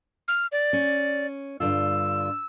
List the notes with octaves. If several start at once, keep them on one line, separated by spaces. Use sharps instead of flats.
F6
D5
C#4
G2 D3 F4 E6